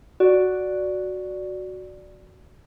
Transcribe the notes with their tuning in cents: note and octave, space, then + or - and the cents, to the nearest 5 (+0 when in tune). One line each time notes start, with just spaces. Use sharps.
F#4 +0 D5 +0